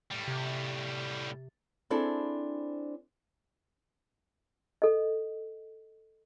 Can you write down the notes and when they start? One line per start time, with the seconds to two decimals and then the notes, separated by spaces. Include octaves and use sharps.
0.11 A2 G3
0.28 C3
1.90 C4 D4 E4 G#4 A4
4.82 A4 D#5